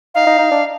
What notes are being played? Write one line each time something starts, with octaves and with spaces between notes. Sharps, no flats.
D#4 F5
D#4
D#4
D4